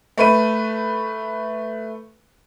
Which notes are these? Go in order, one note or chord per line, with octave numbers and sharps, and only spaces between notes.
A3 B4 D#7